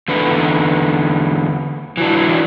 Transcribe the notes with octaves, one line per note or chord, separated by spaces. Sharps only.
E2 D3 B4
E3 F#3 D4